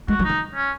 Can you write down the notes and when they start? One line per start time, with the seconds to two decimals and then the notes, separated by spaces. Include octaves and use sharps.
0.08 G#3 F#4
0.19 F#3
0.24 D#4
0.29 D#3
0.55 C#4